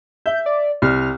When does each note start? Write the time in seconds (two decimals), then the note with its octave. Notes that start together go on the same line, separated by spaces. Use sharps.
0.26 E5 G6
0.46 D5
0.82 C2 F6